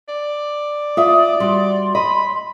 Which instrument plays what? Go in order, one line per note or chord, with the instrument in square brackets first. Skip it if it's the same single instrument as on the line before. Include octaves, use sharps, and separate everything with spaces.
[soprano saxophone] D5
[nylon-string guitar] F4 E5 [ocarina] D#6
[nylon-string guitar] G3 F#4 [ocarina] C6
[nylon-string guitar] D#5 [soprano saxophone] B5